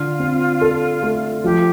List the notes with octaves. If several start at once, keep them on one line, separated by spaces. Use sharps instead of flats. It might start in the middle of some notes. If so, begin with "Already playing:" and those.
Already playing: D3 F4
C4
A4
A3
F3 G4